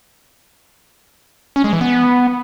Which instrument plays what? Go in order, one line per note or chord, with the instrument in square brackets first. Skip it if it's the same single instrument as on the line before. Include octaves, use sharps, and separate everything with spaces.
[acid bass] C#4
G#3
E3
B3